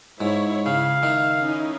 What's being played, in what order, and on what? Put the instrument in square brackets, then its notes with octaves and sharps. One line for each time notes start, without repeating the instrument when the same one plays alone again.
[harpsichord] G#2 [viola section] E4 C#5
[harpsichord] C#3 [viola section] E4 [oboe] F5
[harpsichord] D#3 [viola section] E5
[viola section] C#4 D#4 E4